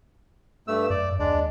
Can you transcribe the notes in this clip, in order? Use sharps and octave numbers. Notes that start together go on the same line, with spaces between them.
G2 A3 E6
F#2 D5
D#2 G#3 D4 D5